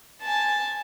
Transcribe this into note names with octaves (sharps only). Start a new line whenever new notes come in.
G#5 A5